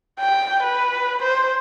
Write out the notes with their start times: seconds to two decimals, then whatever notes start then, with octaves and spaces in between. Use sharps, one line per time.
0.20 G5
0.63 B4
1.23 C5